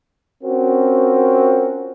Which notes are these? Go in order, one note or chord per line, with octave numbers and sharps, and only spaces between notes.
C4 C#4 F4 F#4 A#4